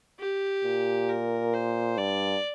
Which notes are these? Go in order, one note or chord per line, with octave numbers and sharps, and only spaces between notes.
G4
A#2
A#4
C5
G2 D5